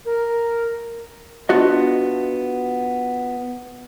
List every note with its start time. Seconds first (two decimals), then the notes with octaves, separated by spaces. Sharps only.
0.05 A#4
1.49 B3 D4 F4 F#4 D#5